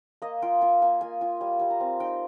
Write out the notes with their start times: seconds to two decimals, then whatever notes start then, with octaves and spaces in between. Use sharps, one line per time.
0.22 A#3 D#5
0.42 F4 G5
0.61 F4 G#5
0.82 A#3 G#5
1.01 A#3 G#5
1.21 F4 G#5
1.41 G3 G#5
1.59 G3 G#5
1.70 A#5
1.80 C4
2.00 D#4 G5